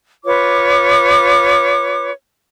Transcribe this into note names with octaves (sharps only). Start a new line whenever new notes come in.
F4 B4 C#5 D6